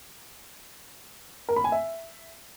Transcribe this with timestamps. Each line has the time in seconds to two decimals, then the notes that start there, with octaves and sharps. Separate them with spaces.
1.49 A#4
1.56 B5
1.64 G#5
1.72 E5